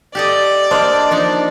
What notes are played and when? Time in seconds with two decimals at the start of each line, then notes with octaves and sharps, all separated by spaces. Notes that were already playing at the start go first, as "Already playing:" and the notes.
0.15 G4 A4 D5 D#5
0.71 A#3 D4 C5 D#5 A5
1.11 F3 D4 D#4